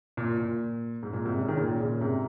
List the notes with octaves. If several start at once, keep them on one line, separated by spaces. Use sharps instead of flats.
A#2
A#2
G#2
A#2
G#2 C3
C#3
D#3
A#2 C#3
A#2 C#3
G#2 C3